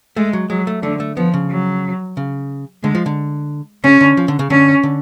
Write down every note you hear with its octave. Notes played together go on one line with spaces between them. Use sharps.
G#3 A3
F#3
F#3 G#3
A3
D3 A3
A3
F3 B3
C#3
F#3
C#3
D3 G#3
F3
D3
C#3 C#4
D3
F3
D3
C#3
D3 C#4
D3